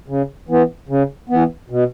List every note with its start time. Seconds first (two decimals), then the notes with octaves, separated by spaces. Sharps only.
0.08 C#3
0.49 E3 B3
0.89 C#3
1.29 E3 B3
1.70 B2